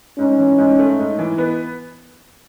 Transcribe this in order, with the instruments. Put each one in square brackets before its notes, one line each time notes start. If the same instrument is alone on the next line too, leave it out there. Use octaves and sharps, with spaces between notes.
[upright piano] G#2 [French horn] C#4
[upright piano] E3
G#2
A3
G#2
E3
B3